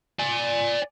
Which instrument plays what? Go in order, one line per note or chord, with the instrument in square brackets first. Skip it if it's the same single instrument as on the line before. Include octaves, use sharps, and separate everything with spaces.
[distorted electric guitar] D5 G#5